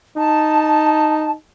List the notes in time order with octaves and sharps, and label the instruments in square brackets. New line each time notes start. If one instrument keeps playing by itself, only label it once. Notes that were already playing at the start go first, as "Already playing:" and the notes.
[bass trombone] D#4 [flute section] A5